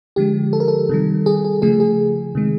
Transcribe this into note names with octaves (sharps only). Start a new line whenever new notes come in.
D3 F3 G#3 G4
A4
A#4
A4
C3 D#3 G3
G#4
G#4
C#3 F3 A3 G#4
G#4
C3 D#3 G#3